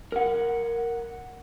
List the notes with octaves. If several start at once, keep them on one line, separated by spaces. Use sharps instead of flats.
A#4 F#5